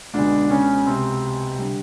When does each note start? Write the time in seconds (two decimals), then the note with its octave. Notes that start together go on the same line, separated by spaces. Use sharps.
0.14 C#2 B2 D3 G#3 D4
0.50 C#3 C#4
0.86 C3 C4
1.58 D3 G3